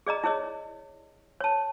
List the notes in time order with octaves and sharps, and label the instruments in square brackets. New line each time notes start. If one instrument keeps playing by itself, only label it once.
[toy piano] G#4 D5 D#5 A#5
E4 G#4 C#5 D#5
C#5 A5